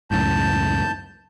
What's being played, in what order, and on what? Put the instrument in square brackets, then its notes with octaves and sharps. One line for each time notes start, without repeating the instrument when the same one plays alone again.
[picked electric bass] C#2 F#2 A2 [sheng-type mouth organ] A5 G6